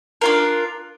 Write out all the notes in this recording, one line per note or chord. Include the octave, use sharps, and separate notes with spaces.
D4 F4 A#4